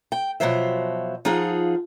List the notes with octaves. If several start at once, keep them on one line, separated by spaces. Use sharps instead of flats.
G5
B2 D#3 F3 F#3 C5 E5
F3 D#4 F4 G#4 F#5